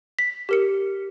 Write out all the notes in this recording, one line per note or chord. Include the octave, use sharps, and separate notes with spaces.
B6
G4 A#4 C#7